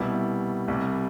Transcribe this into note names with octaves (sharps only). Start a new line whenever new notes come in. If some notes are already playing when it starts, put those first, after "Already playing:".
Already playing: C2 B2 G3 B3 E4
C2 C3 G3